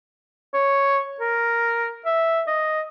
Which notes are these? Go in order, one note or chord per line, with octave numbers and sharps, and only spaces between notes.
C#5
A#4
E5
D#5